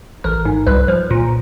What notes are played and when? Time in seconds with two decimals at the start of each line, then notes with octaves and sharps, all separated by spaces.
0.24 A1 A#4
0.45 G#2
0.67 C2 B4
0.88 F3
1.11 A#2